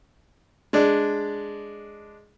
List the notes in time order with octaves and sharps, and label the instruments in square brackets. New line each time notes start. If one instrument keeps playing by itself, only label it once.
[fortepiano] G#3 D4